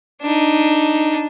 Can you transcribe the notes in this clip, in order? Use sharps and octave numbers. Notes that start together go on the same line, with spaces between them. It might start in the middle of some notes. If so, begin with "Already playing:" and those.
D4 D#4